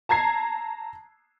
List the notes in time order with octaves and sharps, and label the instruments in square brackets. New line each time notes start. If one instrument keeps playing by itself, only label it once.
[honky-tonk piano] A5 A#5 G#6 C7